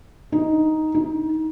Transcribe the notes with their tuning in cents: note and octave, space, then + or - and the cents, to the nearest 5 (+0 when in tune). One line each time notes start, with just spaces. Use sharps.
D#4 +5
D#4 +25